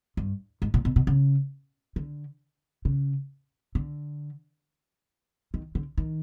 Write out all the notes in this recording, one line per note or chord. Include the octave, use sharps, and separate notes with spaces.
G2
G#2
A#2
B2
B2
C#3
D3
C#3
D3
D#3
D3
D#3